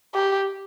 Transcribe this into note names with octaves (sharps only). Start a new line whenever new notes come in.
G4